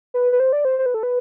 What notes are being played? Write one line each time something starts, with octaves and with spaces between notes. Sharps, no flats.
B4
B4
C5
D5
C5
C5
B4
A4
B4